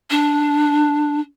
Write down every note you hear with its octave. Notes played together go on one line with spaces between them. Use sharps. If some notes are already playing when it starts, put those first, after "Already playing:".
D4